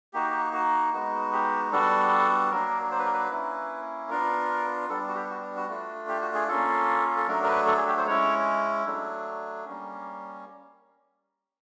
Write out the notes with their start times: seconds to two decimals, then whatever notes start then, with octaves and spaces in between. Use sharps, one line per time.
0.13 A#3 D#4 F#4 G4
0.53 F#4
0.93 G#3 B3 D#4 F#4
1.32 G4
1.72 G3 B3 D4 F#4 A4
2.51 F#3 A#3 D4 A#4
2.91 C5
2.99 B4
3.06 A#4
3.13 B4
3.31 A#3 C#4 E4
4.10 B3 D4 F4 A#4
4.89 G3 B3 D4 A4
5.08 F#4
5.16 G4
5.30 F#4
5.56 F#4
5.68 A3 D4 F4
6.08 G4
6.21 F#4
6.34 G#4
6.48 A#3 C#4 F4 A4
7.17 A4
7.27 F#3 A3 D4 A#4
7.43 A#4
7.47 B4
7.67 A4
7.77 G#4
7.87 G4
7.97 C5
8.07 G#3 C#4 E4 C#5
8.86 F#3 A3 D4
9.65 G3 A#3 C#4